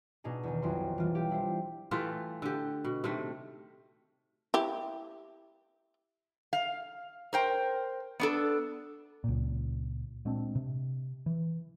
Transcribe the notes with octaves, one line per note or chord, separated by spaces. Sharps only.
B2 D4 D#4 G#4
E2 D#3
B1 F2 E4 F#4 C6
E3 G3 F4
G4
D4 E4 C5
E3 A3 F4 G4
D3 G4
B2
C3 D#3 A3
E4 G4
F5
A#4 C5 G5
B3 D4 A4
C#2 A#2
A#2 G#3 C4 D4
C3
E3